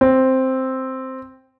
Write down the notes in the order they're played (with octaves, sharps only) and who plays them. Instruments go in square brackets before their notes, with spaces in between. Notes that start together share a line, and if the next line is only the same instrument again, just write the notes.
[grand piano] C4